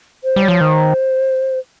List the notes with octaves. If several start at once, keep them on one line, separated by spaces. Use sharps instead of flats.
C5
G3
C#5
F3
D#3 C5